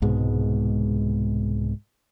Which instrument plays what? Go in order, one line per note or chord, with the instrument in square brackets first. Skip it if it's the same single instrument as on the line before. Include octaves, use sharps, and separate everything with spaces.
[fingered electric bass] C2 G#2 B2 G#3